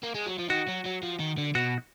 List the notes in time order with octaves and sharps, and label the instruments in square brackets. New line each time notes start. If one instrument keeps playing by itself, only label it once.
[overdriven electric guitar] A#3
G#3
F#3
F3
[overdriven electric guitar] D#3 [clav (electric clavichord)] F#4
[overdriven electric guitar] F#3
F#3
F3
D#3
D3
[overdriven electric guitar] B2 [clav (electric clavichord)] F#4